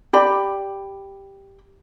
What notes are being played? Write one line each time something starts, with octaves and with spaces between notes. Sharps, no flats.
G4 D5 B5